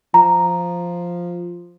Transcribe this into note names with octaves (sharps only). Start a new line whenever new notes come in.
F3 A#5